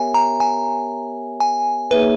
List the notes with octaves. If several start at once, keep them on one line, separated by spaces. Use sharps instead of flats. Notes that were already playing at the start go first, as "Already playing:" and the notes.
Already playing: B3 G4 A#4 C#5 E5 G#5
A#5
G#5
G#5
A#3 D#4 G#4 B4 C#5 E5